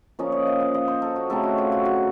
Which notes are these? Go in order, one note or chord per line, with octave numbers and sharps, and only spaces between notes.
A#2 F3 A#3 C#4 D#5
D#5
D#5
F5
D#5
C5
A4
F#4
C#3 A3 C4 D#4 A4
F#4
F4
F#4
F#4